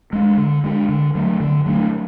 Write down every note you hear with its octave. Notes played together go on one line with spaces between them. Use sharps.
G#3 D4
D3
G#3 D4
D3
F#3 A3 D4
D3
F#3 A3 D4